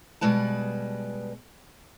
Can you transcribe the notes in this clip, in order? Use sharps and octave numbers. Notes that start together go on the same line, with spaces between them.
B2 G3 G#3 B4 A5